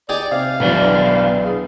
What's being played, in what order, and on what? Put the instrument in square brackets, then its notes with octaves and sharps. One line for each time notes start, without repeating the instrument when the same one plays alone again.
[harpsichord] D#4 G4 G#4 [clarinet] D5
[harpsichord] C3 [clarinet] F5
[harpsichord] B1 E3 [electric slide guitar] B2 B3 D4
[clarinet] G#4